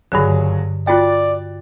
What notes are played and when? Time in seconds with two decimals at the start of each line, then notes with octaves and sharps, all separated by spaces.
0.12 F#1 G2 D3 F#3 G#4
0.87 F4 F#4 D5 G5 F#6 A6